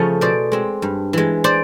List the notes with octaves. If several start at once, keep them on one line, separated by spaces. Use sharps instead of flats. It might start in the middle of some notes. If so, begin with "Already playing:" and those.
Already playing: C#3 F3 A3 C#4
B2 C5 D5
G#3 C4
G2
E3 G#3
C5 D5